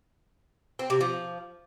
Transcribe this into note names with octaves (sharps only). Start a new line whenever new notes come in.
C4
C3
F3